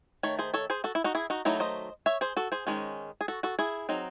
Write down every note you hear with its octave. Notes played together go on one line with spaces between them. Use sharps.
D#3 A3 C#5
G#4 C5
A4 C#5
G#4 C5
F#4 A4
E4
D#4 F#4
E4 G#4
D#4 F#4
D#3 F#3 A3 D#4 E4
C5 D#5
C#5 E5
G#4 C5
F#4 A4
G#4 C5
D#3 G#3 C#4
G#4
F#4 A4
F#4 A4
E4 G#4
F#3 C4 D#4